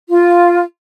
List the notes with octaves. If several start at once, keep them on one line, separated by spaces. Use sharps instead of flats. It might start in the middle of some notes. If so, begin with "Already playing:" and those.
F4